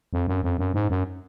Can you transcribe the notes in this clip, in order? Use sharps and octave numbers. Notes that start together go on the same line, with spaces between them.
F2
F#2
F2
F#2
G#2
F#2